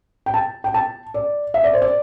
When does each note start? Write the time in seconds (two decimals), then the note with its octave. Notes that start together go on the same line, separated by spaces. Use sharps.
0.26 G5
0.34 A5
0.64 G5
0.74 A5
1.14 D5
1.54 E5
1.64 D5
1.74 C5
1.82 D5